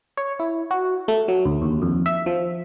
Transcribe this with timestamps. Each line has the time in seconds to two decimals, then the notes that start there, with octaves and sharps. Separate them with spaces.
0.17 C#5
0.39 E4
0.71 F#4
1.08 A3
1.28 F#3
1.45 D2
1.62 D#2
1.82 F2
2.06 E5
2.26 F3